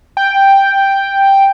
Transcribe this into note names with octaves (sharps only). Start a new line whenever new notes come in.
G5